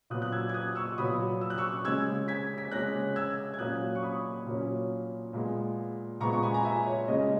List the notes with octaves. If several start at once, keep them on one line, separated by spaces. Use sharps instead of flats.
A#2 F#3 B3 D#6 F#6
F#6
E6 G#6
G#6
D#6 F#6
C#6 E6
A#2 F#3 B3 B5 D#6
E6
F#6
C#6 E6
C#3 G#3 C#4 E6 G#6
G#6 B6
B6
C#3 G#3 C#4 F#6 A#6
E6 G#6
G#6
A#2 F#3 A#3 C#4 D#6 F#6
C#6
B5 D#6
A#2 F#3 A#3 C#4
A#2 G#3 B3
A#2 G#3 B3 A#5 C#6
C#6
G#5 B5
A#5
E5 G#5
C#5
C#3 G#3 C#4 D#5